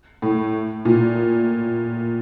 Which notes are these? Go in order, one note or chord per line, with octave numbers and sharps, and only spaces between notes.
A2
A#2